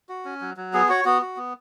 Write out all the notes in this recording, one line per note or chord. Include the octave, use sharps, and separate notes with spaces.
F#4
C#4
F#3
F#3
B3 G#4
F#4 C#5
B3 F#4
F#4
B3